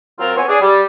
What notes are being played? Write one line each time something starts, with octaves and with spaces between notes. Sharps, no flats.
F#3 C4 F4 A#4
B3 C4 C#5 G#5
D4 G#4
G3